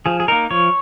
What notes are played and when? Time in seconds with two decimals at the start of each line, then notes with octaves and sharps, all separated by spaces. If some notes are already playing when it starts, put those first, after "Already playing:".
0.06 F3 G#4
0.20 G#4
0.28 A#3 D#4 A#4
0.51 F3 C#5